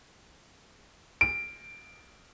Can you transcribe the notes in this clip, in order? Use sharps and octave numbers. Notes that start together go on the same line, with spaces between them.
D7